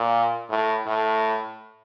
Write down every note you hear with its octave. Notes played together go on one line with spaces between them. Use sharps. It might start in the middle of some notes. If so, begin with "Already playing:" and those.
Already playing: A#2
A2
A2